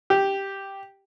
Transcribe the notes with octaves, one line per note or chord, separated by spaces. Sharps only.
G4